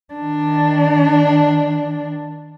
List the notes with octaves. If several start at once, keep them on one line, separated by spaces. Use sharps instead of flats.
D#3 D4